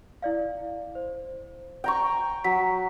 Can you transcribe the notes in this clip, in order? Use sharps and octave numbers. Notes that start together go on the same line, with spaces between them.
E4 D5 F5
C5
G5 A#5 C#6
F#3 A#5 B6